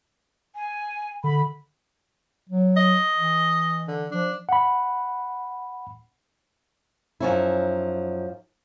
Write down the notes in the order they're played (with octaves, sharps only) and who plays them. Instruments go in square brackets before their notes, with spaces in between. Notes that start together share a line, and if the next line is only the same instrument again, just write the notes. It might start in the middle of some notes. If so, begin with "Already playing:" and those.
[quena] G#5
[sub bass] D3 [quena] B5
[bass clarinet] F#3
[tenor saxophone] D#5
[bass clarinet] E3
[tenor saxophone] D3
[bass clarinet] F3 [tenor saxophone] D4
[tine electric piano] F#5 B5
[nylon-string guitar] F#2 F3 G3 C#4 D#4 E4